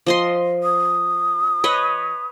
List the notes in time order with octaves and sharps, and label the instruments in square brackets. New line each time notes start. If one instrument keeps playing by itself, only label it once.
[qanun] F3 D#5 C6
[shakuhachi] D#6
[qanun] B4 C#5 D#5